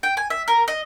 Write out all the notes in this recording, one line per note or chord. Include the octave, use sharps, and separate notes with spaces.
G5
G#5
E5
A#4
D#5